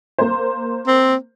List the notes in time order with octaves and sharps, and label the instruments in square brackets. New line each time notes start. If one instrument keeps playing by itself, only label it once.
[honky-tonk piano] A#3 C5
[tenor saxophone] C4